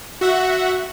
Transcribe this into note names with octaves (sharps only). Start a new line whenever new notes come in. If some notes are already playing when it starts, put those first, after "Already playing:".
F#4 E5 F#5